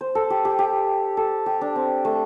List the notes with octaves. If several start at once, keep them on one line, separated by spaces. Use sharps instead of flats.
C5
A4
G4
G4
G4
A4
G4
D4
C4
A3